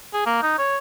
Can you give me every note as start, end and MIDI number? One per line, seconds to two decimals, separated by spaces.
0.13 0.22 68
0.26 0.41 58
0.42 0.53 63
0.58 0.78 73